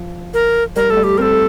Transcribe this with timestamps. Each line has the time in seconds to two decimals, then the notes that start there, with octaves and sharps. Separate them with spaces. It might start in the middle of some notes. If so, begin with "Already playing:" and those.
Already playing: F3
0.34 A#4
0.76 G3 A#4
0.90 A3 A4
0.97 G3
1.03 G4
1.18 C4 A#4
1.22 A4
1.31 A3